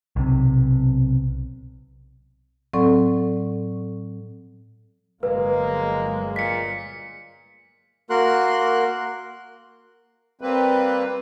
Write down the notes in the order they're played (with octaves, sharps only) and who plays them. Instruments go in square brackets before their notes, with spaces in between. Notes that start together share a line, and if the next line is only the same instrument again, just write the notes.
[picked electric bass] B1 C3
[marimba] A2 F#3 C4 A4 D5 C#6
[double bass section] G1 F#3 G#3 [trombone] A#3 [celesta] B4
[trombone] A#2 [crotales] B6 C#7
[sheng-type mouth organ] A#3 F#4 A#4 C6 F#6
[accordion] G3 A#3 C4 B4